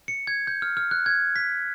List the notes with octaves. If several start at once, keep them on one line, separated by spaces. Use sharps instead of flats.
C#7
G#6
G6
F6
F6
F#6
G#6
B6